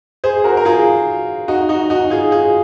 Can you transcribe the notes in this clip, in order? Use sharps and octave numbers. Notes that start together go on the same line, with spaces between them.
G#4 C5
F#4 A#4
A#4
F4 G#4
D#4 F#4
D#4 F#4
D#4 F#4
F4 G#4
F4 G#4